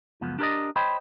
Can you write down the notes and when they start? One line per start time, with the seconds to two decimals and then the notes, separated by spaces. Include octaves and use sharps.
0.21 C#2 F#2 F3 B3
0.39 D4 G4 A#4 B4 D5 D#5
0.76 C5 C#5 D#5 G5 B5 C6